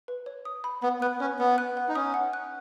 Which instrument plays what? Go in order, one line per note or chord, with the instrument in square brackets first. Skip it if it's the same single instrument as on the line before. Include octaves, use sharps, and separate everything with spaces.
[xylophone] B4
C#5
D#6
B5
[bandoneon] B3 [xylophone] B5
[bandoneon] B3 [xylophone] F#6
[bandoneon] C#4 [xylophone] C#5
[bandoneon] B3 [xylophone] F#5
[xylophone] F#6
F#5
[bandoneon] D#4
[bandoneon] C#4 [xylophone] D#6
[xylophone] F#5
F#6